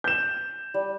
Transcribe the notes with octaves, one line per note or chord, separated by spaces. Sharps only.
G6 E7
G3